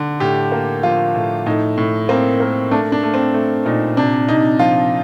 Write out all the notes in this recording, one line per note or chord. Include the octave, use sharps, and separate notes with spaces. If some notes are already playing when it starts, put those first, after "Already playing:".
Already playing: D3
A2 G4
A#3
F3 F4
A2
A2 D#4
A2
A#3 C4
A#3
A3 D4
D4
A3
C4
A3
A#2 D#4
C3 D4
C3 D#4
F3 F4